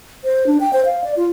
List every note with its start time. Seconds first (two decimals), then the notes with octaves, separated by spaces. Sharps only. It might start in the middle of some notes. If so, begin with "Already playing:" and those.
0.24 C5
0.47 D4
0.60 G5
0.73 C5
0.85 F5
1.04 D5
1.17 F4